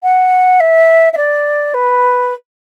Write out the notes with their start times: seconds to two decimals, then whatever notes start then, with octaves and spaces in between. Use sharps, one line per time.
0.03 F#5
0.60 E5
1.13 E5
1.17 D5
1.74 B4